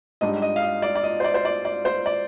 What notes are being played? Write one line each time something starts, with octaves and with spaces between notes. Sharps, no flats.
G#2 G3 D4 D#5
D#5
F5
D#5
D5
D5
D#5
C5
D5
C5
D5
D5
C5
D5